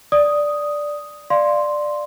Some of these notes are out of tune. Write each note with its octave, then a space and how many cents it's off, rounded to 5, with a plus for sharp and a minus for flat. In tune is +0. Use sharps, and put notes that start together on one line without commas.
D5 +0 D#6 +0
D5 +10 F5 -10 C6 +0